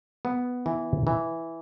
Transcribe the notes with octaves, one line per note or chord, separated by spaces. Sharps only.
B3
E3
E3